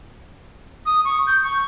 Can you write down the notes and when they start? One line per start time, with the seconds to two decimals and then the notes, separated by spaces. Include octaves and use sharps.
0.86 D#6
1.05 C#6
1.27 G6
1.43 C#6